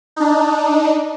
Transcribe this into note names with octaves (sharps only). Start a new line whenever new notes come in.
D4 D#4